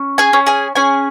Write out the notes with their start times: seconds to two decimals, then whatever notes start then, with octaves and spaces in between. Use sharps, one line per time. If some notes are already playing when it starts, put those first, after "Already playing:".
Already playing: C#4
0.18 G#4 G#5
0.33 C#4
0.47 G#4 G#5
0.75 C#4 G#4 G#5